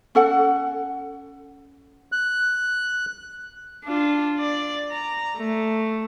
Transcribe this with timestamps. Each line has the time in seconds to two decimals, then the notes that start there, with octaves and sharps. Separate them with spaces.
0.15 C#4 A4 F#5
2.12 F#6
3.85 D4 F4
4.39 D5
4.91 A#5
5.37 A3